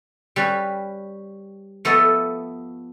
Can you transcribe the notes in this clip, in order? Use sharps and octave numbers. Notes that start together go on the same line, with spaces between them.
G3 C#4 B4
F3 A3 B3 A4 D#5 E5